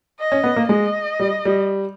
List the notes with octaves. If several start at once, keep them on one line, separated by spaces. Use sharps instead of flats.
D#5
C#4
B3
A#3
G#3 D#5
G3
G3